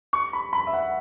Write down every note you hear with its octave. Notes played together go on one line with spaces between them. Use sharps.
C#6
B5
B5
E5
F#5